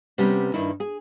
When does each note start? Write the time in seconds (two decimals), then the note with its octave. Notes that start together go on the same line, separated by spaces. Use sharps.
0.18 C3 G3 B3 C#4
0.54 G2 D#3 D#4 E4
0.80 G#4